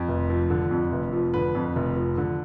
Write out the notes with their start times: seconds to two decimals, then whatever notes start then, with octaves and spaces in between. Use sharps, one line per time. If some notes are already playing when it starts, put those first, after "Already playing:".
Already playing: F2
0.09 F1
0.30 F3
0.50 D3
0.71 F2
0.92 F1
1.13 F3
1.34 D3 B4
1.55 F2
1.76 F1
1.97 F3
2.17 D3